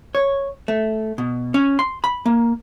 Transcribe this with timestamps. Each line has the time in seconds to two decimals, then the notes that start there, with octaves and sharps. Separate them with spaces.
0.15 C#5
0.68 A3
1.18 B2
1.54 C#4
1.79 C6
2.04 B5
2.26 A#3